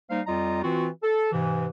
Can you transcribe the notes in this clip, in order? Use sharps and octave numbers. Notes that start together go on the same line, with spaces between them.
G3 A#3 D#4 C5 F5
F2 G3 F4 D#5 A#5
E3 C4 F4 F#4
A4
G#2 C3 E3